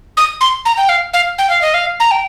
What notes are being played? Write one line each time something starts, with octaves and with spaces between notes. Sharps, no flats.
D#6
C6
A#5
G5
F5
F5
G5
F5
D#5
F5
A#5
G5